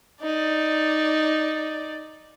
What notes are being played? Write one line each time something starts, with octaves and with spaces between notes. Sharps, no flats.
D#4 D5